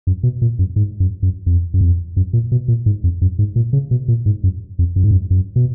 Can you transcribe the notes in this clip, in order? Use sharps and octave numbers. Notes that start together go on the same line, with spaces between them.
F#2
B2
A#2
F#2
G#2
F#2
F#2
F2
F#2
F2
F#2
A#2
B2
A#2
G#2
F2
F#2
G#2
A#2
C#3
B2
A#2
G#2
F#2
F2
F#2
G#2
F#2
F#2
B2